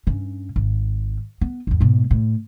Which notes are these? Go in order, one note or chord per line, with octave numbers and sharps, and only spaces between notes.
G2 C#4
G#1
B3
G#1 E2
G#2 B2
A2